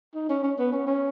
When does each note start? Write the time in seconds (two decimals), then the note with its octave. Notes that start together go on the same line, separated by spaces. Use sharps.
0.15 D#4
0.29 C#4
0.43 C#4
0.59 B3
0.72 C#4
0.87 C#4